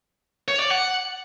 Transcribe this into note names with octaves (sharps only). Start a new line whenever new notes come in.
C#5
D5
F#5